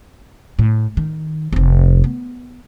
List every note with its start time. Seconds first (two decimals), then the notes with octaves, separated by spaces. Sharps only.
0.59 A2
0.97 D#3
1.53 F1 C4
2.04 B3